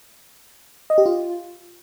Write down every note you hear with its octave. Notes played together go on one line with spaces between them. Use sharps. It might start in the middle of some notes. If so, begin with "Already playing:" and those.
D#5
G4
F4